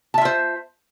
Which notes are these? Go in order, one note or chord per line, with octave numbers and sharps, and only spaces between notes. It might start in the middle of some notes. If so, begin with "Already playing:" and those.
F4 C5 E5 A5